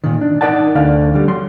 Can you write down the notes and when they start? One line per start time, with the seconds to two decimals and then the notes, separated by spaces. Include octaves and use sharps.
0.04 A#2 D#3
0.21 D4
0.41 D#4 A#4 D5 F#5 A5
0.75 D2 D3 D5 F5
1.14 D3 G3
1.28 F#3 C6